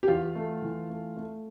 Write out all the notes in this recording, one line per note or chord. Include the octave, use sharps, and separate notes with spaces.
G4
E2 F4
A3
E3
A3
A3